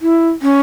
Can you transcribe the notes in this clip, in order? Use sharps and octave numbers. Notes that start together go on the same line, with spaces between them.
E4
C#4